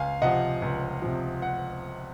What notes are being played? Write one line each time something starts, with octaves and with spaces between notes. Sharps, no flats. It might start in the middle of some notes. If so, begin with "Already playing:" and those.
Already playing: C#2 F5 G#5
C3 F3 D#5 F#5
C#2
C3 F3
F#5